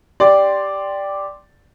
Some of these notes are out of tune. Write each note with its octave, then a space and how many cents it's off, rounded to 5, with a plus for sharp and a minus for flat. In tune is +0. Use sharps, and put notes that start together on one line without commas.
G4 +0 D5 +0 C6 +0